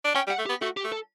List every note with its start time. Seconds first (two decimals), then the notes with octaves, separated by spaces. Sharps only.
0.05 D4
0.15 C#4 G5
0.27 G3
0.30 F#5
0.39 A3
0.46 G4
0.49 B3
0.61 A3 F#4
0.77 G4
0.84 A3
0.92 A4